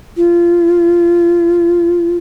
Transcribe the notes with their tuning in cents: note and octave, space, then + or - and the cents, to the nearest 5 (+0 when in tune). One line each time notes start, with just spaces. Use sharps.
F4 -25